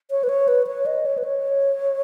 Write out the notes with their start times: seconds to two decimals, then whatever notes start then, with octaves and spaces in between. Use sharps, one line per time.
0.11 C#5
0.24 B4
0.29 C#5
0.48 B4
0.67 C#5
0.86 D#5
1.06 C#5
1.18 B4
1.24 C#5